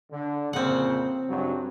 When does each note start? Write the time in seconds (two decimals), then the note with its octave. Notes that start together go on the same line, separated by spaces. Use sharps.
0.12 D3
0.53 F2 A#2 C#3 C4 F#5
1.29 C#2 G2 F#3